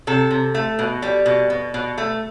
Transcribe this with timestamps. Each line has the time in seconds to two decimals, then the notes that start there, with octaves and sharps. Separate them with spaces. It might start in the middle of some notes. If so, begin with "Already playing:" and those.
0.07 C3 A4
0.31 C3
0.55 A3
0.79 B2
1.02 G3
1.26 B2
1.50 B2
1.74 B2
1.98 A3